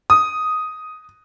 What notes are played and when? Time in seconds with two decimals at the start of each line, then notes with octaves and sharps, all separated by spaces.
0.10 D#6